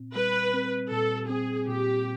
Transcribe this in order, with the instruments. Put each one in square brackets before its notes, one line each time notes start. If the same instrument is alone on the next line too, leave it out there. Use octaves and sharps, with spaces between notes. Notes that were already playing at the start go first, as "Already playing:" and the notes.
Already playing: [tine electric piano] A#2 C4
[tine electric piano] G3 [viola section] B4
[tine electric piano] C4
[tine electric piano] A#2 [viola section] A4
[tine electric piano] C4 [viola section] G#4
[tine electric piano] A#2 [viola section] G4